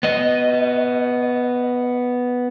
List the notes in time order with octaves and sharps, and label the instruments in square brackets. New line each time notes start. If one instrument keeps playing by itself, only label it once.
[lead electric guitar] B3 D#5